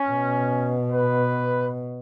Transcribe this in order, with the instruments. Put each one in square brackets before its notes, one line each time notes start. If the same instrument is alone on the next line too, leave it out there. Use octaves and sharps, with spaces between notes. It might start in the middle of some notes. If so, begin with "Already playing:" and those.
Already playing: [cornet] C#4
[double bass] B2
[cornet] B4